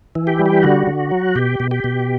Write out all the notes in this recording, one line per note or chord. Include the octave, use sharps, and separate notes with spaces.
E3
G4
G3
G4
D3 F#4
D3
F#3
B2 G4
B2
G4
B2